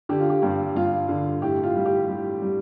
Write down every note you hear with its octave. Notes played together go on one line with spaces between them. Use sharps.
D3 G4
F4
G4
G2 G4
G2 F4
D3
A2 G4
F4
G3
G4
G3
G3